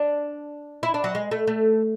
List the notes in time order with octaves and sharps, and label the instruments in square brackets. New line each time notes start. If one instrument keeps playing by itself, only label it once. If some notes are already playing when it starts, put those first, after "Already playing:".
Already playing: [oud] D4
E4
D4
F#3
G#3
A3
A3